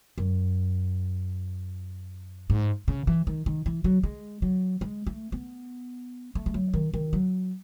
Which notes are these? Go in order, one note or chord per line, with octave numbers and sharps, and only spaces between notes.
F#2
G#2
C#3
E3
D#3
D#3
E3
F#3
G#3
F#3
G#3
A3
B3
A3
G#3
F#3
D#3
D#3
F#3